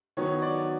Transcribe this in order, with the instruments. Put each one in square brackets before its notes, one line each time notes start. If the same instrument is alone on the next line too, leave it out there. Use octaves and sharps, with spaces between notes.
[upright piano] D#3 F#3 B3 C#5
D5